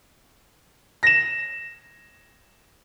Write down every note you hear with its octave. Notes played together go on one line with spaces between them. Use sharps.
A#6 E7